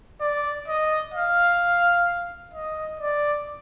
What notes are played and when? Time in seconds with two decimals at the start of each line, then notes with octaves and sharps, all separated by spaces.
0.21 D5
0.68 D#5
1.14 F5
2.54 D#5
3.00 D5